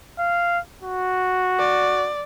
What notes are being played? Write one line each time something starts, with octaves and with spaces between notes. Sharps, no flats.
F5
F#4
D5